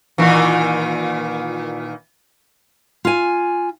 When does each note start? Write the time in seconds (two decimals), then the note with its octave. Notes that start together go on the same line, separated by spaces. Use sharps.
0.18 A#2 D#3 E3
3.05 F4 G#5